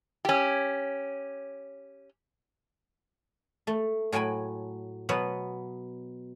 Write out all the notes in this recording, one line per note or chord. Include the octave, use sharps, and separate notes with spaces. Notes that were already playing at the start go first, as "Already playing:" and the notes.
C#4 G4
A3
A2 F#3 G5 G#5 B5
B2 F#3 B3 F#5